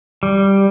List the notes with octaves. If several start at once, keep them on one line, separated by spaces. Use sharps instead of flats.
G3